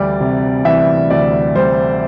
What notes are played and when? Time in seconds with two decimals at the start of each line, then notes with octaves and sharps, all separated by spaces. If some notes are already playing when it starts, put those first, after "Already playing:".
Already playing: D2 E3 G3 D5
0.20 C3
0.65 E3 E5
1.10 D2 D5
1.56 G3 C5